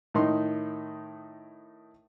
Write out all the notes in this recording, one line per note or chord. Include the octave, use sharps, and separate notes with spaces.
A2 D#3 D#4 C6